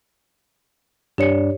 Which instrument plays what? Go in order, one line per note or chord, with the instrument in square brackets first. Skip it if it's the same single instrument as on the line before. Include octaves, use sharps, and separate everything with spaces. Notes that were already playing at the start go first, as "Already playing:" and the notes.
[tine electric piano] G2 D4 D5 [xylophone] G4 C#5 C#7